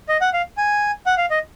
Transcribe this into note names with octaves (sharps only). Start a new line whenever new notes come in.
D#5
F#5
F5
G#5
F#5
F5
D#5